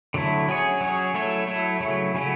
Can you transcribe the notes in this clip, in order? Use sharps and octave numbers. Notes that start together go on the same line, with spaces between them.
D3 F#3 A3 E4
F#3 C#4 G#4 C#5
F#3 C#4 G#4 C#5
F#3 A3 E4 A4 C#5
F#3 A3 E4 A4 C#5
C#3 F#3 A3 C#4 E4
C#3 F#3 A3 C#4 E4